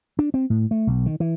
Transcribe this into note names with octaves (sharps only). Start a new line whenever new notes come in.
D4
C4
A2
A3
B1
D#3
E3